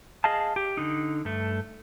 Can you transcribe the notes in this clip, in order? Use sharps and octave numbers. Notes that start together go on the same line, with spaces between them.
G#4 D#5 F5 A5
G4
D3 D#4
G2 A3